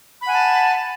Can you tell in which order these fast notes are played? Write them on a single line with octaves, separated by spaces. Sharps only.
B5 F#5 G#5 A5